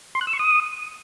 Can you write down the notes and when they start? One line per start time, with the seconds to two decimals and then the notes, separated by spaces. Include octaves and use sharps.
0.15 C6
0.21 F#6
0.27 E6
0.33 C#6
0.39 D#6